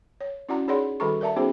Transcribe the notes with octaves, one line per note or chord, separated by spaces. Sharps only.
C#5
C#4 E4 F#4 D5 F#5 A#5
D#4 G#4 C#5 D5 F#5 C6
D#3 G3 F#4 A4 A#5 C#6
A#4 D5 E5 A5 A#5
B3 C#4 D#4 F#4 G#4 C5